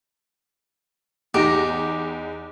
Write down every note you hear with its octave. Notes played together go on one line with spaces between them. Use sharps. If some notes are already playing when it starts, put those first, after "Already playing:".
E2 D#4 G4 A#6